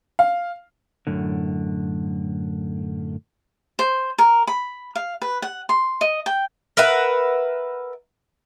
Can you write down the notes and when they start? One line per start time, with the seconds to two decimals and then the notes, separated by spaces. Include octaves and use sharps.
0.19 F5
1.07 F#2 A2 D3
3.79 C5
4.18 A#4
4.47 B5
4.95 F5
5.22 B4
5.42 F#5
5.69 C6
6.01 D#5
6.26 G5
6.77 A#4 B4 E5 F#5